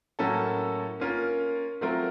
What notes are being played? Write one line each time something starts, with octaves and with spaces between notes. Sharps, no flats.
A2 F#3 A#3 C#4 A4
A#3 C#4 F4 A#4
F#3 A3 C4 F4 A#4